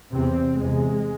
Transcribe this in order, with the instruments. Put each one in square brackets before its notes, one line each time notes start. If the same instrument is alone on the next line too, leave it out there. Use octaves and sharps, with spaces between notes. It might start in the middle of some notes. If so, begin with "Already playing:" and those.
[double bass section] E2 C3 C4
E2 C3 G#3